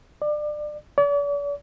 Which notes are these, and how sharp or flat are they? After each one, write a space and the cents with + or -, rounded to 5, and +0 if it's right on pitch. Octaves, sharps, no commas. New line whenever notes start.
D5 +25
D5 -45